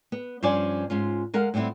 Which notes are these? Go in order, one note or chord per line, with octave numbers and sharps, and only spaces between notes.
B3
G2 F3 C#4 C5 D5 G#5
G#2 C#4 F4
G#3 A#4 F5 F#5
A2 G3 B3 C4 E4